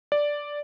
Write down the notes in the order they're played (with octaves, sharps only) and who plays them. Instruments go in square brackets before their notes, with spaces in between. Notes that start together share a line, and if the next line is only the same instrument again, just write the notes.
[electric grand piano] D5